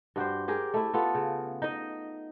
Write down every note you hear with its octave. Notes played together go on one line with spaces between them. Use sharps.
G2 F#4 G4 C5
G4 G#4 A#4
A3 E4
B3 F4 A4
C#3
D#4 D#5